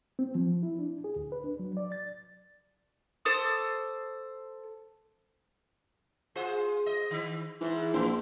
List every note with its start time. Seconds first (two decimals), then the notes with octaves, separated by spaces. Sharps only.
0.19 C4
0.35 F3
0.63 E4
0.79 D4
1.04 G#4
1.16 D2
1.32 B4
1.44 D4
1.59 F#3
1.77 D5
1.92 A6
3.25 A4 C5 D6 D#6
6.35 F4 G#4 C5
6.86 D#5
7.11 D#3
7.61 G#2 E3
7.94 A#1 B3